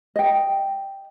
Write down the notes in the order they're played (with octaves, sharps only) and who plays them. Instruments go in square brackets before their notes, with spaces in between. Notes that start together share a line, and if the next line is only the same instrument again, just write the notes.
[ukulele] D#5 G5